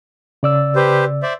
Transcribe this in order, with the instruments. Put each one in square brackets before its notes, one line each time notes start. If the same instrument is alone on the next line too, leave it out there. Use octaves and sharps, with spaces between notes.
[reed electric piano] C#3 D5 E6
[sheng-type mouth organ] G4 B4 C5
C5 D5 E5